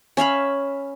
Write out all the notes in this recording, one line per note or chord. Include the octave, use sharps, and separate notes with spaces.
C#4 E5 F5 B5